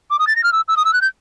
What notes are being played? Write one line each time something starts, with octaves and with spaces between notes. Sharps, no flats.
D6
D#6
A6
A#6
F6
E6
E6
D#6
E6
F#6
G6